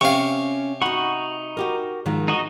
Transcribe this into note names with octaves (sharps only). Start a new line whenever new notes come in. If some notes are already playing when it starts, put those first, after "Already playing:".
C3 C#4 F5 C#6
D#4 F#4 F#5 B5 C#6
F#4 G4 A#4
G#2 D#3 F3
D#4 F#4 D#5